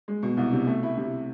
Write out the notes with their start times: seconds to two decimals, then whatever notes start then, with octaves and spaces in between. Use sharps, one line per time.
0.08 G#3
0.23 B2
0.37 C2
0.53 C3
0.67 A3
0.83 E4
0.97 C3